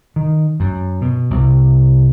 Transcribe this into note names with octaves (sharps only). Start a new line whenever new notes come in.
D#3
F#2
B2
C2